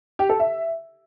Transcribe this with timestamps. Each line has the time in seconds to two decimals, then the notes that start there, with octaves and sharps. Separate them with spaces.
0.19 G4
0.29 A4
0.40 E5